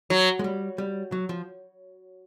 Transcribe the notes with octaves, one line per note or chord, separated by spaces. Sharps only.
F#3
G#3
G3
G3
F#3
F3